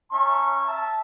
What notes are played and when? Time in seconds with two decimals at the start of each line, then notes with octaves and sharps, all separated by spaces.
0.12 C#4 E5 A5 A#5 C#6
0.65 E5 A5